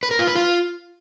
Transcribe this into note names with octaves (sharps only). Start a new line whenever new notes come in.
B4
A#4
F4
B4
F4